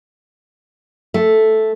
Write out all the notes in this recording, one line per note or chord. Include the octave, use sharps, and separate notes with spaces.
A3